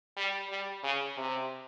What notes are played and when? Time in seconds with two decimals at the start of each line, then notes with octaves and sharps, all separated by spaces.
0.17 G3
0.50 G3
0.83 C#3
1.17 C3